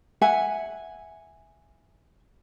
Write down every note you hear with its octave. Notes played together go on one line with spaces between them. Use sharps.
E5 F#5 G#5